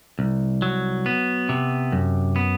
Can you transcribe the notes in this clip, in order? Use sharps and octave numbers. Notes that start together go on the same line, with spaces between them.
C2
F#3
B3
C3
F#2
B3